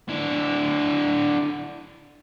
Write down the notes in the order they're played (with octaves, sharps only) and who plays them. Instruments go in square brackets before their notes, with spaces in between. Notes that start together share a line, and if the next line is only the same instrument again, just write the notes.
[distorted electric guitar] D3 E4